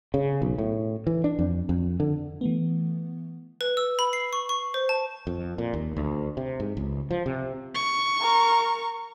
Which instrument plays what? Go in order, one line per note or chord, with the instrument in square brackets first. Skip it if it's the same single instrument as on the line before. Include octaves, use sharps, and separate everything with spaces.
[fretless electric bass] C#3
B1
A2
E3
D4
F2
F2
D3
[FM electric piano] E3 A3 B3
[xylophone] B4
E6
B5
C7
C#6
C#6
C5
A5
[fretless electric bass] F2
A#2
D#2
D2
C3
G#2
C#2
F3
C3
[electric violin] C#6
[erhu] A#4